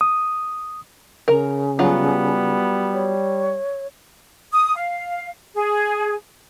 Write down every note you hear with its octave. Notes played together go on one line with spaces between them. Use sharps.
D#6
C#3 A#4 A#5
F#3 G3 B3 F4
C#5
D#6
F5
G#4